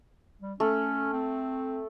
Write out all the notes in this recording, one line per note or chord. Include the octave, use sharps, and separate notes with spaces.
G3
A3 C#4
C4